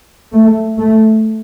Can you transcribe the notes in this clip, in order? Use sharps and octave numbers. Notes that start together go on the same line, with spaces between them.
A3
A3